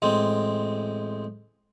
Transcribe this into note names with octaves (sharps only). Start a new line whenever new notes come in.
A1 G#3 C4